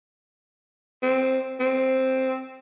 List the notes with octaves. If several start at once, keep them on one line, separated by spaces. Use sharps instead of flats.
C4
C4